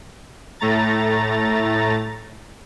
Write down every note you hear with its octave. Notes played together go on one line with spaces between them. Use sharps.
A2 A3 A#5 A6